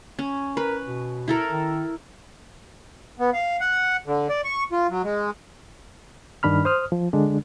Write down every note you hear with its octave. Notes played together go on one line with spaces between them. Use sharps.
C#4
A#4 B4
B2
E4 A4 A#4
D#3
B3
F5
F#5
D3
D5
C#6
F4
F#3
G#3
G2 D#3 D4 B5 F6
C5 D#6 F6
F3
D3 G#3 D4